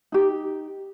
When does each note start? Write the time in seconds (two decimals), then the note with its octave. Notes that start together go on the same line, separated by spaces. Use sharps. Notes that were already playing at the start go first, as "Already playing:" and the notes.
0.12 D#4 G4